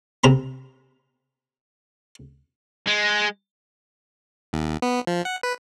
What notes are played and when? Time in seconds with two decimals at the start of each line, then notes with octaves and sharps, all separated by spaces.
0.24 C3 A#5 B5
2.87 G#3
4.53 D#2
4.82 B3
5.07 F3
5.25 F#5
5.43 B4